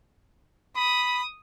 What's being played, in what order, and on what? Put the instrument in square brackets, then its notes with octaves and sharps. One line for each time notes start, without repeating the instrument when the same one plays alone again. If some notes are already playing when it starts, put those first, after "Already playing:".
[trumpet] B5 [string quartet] D#6